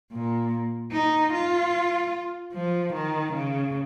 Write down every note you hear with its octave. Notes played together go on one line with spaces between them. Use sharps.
A#2
D#4
F4
F3
D#3
C#3